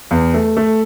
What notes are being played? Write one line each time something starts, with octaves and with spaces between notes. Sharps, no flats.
E2
A3
A3